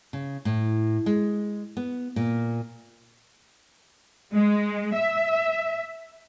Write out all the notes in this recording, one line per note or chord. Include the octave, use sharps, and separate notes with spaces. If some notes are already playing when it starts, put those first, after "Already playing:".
C#3
A2
G#3
B3
A#2
G#3
E5